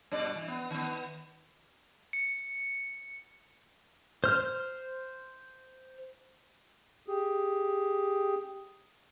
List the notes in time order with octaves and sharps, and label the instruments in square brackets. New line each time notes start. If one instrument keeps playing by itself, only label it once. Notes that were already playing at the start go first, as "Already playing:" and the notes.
[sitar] G2 B2 D5
E3
B3
D#3 B3
[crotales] C#7
[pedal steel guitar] C5 F6
[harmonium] G4 G#4